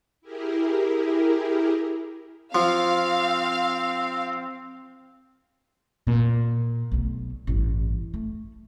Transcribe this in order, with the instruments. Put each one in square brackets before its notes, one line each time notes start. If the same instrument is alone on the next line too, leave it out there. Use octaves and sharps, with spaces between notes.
[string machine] E4 G4 G#4 A#4
[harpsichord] F3 [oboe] C4 [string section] F5
[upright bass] A#2
B1 A3
A1 G2
A3